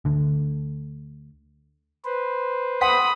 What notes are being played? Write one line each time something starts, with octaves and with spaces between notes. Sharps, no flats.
D2 D3
B4 C5
F#5 B5 C6 D#6 B6